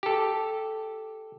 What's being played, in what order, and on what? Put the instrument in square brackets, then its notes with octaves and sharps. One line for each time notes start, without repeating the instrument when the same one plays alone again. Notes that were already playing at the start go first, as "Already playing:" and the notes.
[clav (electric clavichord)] G4 A4